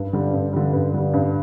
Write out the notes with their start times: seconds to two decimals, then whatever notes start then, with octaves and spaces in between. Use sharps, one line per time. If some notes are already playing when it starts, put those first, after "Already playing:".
Already playing: G2
0.13 D3 G3
0.34 G2
0.53 D3 G3
0.73 G2
0.94 D3 G3
1.14 G2